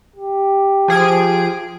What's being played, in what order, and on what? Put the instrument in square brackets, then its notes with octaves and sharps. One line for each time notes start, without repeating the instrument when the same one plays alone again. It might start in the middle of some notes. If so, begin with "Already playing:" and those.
[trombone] G4
[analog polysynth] F3 G#4 D7